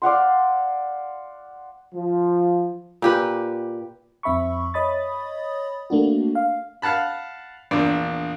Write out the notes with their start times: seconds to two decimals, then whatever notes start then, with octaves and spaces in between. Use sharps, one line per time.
0.02 D5 F5 F#5 C6
1.94 F3
3.02 A#2 G4 B4
4.23 F2 C4 E5 B5 C#6
4.74 C#5 D#5 B5 D#6 A6
5.90 A3 A#3 D4 F#4
6.35 F5
6.82 F5 F#5 A5 B5
7.71 A#1 E2 D4 D5